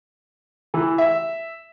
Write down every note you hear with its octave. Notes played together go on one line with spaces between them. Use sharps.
E3
E5